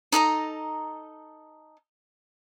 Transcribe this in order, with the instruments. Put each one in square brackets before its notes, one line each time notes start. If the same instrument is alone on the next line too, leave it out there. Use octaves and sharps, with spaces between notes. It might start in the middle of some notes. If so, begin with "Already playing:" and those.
[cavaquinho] D#4 A4 D#5 A#5